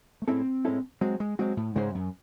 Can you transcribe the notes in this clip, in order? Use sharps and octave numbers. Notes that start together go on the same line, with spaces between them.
A3
A2 G#3 C4 C#4 E4 A4
A2 G#3 C#4 E4 A4
F#3 G#3 C4 F#4
G#3
F#3 G#3 C4 F#4
A2
G#2 C#3 G#3 C#4 G#4 C5
F#2